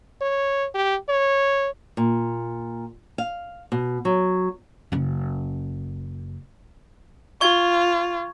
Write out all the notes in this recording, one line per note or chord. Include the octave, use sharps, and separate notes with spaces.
C#5
G4
C#5
A#2
F5
B2
F#3
F#1 C#4
F4 C#6 G#6